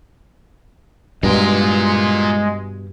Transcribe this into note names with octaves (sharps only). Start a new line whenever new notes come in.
G2 B2 G#3 F4 A#4